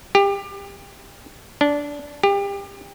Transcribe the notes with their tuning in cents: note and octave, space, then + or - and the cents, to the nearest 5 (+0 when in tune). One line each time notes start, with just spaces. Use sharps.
G4 +25
D4 -15
G4 +30